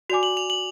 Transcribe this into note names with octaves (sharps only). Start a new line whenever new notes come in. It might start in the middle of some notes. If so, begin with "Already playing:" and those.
F#4 D5 G#5 D6 F7
F#7
F7
F#7